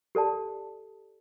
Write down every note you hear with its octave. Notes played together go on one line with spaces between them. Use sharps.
G4 A4 D5 A5